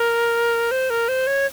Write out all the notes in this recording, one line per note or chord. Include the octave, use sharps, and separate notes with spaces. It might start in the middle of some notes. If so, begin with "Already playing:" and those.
Already playing: A#4
C5
A#4
C5
C#5